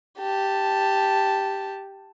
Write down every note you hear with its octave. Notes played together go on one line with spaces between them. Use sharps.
G4 A5